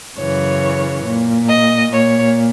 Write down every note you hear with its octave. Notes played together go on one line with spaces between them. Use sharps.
F#2 C#3 E3 C#5
A#2
D#5
A#2 C#5